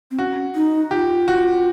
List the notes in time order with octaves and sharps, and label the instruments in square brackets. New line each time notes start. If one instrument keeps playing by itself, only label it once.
[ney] C4
[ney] C#4 [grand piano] F#4
[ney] D#4
[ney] F4 [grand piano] G4
[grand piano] F#4